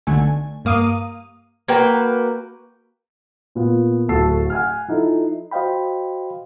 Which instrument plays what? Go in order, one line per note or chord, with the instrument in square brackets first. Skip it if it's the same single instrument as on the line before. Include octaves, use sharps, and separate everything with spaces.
[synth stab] B1 D3 A3 G#5
G2 A#3 F5 D#6 D#7
[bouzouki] A#3 F#4 B4 G5
[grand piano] A#2 B3
D1 A3 F#4 A5 E6 C7
F#5 G#5 F6
F3 D#4 E4 A4
[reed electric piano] F#4 C5 D#5 F5 G5 B5